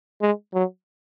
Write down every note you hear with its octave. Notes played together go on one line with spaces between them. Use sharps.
G#3
F#3